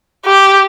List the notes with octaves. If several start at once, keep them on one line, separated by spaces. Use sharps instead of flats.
G4